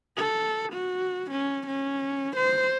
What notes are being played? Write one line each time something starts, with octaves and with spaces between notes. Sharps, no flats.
A4
F#4
C#4
C#4
C5